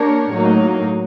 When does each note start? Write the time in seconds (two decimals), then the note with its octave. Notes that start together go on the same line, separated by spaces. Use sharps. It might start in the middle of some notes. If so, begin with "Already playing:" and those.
Already playing: A#3 D4 G4 A#4 C#5
0.33 A2 F#3 A#3 D#4